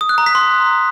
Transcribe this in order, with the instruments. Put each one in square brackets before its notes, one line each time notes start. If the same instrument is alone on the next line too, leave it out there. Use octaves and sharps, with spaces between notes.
[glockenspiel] D#6
F#6
A#5
B6
C6